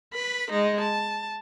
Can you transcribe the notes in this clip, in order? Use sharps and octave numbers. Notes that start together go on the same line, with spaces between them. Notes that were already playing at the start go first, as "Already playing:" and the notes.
B4 B5
G#3 D#4
A5